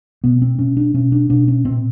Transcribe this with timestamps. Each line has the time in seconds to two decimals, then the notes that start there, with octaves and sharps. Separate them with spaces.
0.24 B2 B3
0.42 C4
0.59 B2 C#4
0.77 D4
0.94 B2 C#4
1.12 D4
1.30 B2 D4
1.48 C#4
1.65 A#2 C4